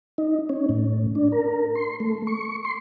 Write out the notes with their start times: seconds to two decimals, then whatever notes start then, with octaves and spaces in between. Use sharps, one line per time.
0.18 D#4
0.49 C#4
0.69 A2
1.15 D4
1.32 A#4
1.75 C6
2.00 A3
2.27 C#6
2.65 C6